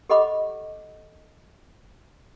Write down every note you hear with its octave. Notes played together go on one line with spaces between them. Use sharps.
G4 A4 D#5 F#5 B5 D6